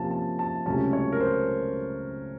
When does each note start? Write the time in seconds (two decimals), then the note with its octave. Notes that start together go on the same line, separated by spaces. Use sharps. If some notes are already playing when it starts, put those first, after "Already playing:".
Already playing: C3 F3 A#3 C#4 A5
0.11 A5
0.39 A5
0.66 C#2 C3 F#3 A3 C#4 A5
0.93 C#5
1.12 A#4
1.20 C5